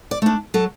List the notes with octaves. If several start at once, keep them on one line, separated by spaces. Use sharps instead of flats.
D5
A3 D4
F#3 A4